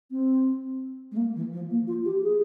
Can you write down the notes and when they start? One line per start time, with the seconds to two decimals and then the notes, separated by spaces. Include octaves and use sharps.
0.11 C4
1.12 G#3
1.17 A#3
1.35 E3
1.53 F3
1.70 A#3
1.87 F4
2.05 G4
2.23 G#4